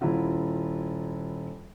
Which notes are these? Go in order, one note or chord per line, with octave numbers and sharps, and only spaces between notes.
D#1 E4 F4 F#5